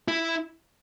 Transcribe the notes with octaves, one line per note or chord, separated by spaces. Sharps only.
E4